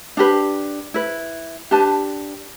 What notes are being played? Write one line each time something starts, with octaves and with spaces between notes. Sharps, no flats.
D4 G4 B4
E4 B4
D4 G4 B4 A5